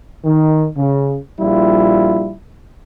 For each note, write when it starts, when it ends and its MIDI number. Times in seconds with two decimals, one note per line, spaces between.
0.25 0.67 51
0.77 1.16 49
1.40 2.33 34
1.40 2.33 55
1.40 2.33 64
1.40 2.33 65